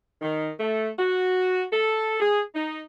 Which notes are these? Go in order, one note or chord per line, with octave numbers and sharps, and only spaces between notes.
D#3
A3
F#4
A4
G#4
D#4